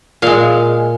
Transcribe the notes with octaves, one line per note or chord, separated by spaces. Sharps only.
A#2 G#3 F5